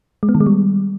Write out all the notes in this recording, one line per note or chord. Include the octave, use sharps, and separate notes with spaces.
G#3
B3
D#3
G#3
G3